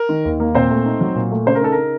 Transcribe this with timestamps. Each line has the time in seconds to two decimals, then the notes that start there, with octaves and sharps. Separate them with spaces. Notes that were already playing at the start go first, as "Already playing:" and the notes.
Already playing: A#4
0.09 D#3
0.25 D#2
0.40 A#3
0.55 A#2 C4 C5
0.70 A3
0.85 D#4
1.01 F#3
1.15 A#2
1.31 A3
1.46 C#3 C5
1.55 A#4
1.61 D#4 A4
1.72 C#3 A#4